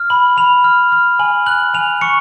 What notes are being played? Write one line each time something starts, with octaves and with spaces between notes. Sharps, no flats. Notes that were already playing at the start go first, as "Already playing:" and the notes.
Already playing: F6
B5 F#7
B5 F7
F6
F6
G#5 F#7
F#6 F#7
G#5 F7
C#6 C#7